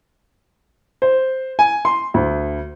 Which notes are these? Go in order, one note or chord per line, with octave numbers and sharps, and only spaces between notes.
C5
G#5
C6
D2